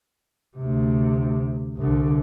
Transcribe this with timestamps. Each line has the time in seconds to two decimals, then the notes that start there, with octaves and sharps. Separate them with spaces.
0.57 D2 C3
1.77 C2 D3